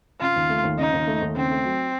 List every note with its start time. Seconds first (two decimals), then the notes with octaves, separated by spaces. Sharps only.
0.21 C#3 F4
0.36 D#2
0.49 A3
0.64 D#2
0.78 C#3 D#4
0.93 D#2
1.07 A3
1.21 D#2
1.36 C#3 C4
1.50 A3
1.64 F#3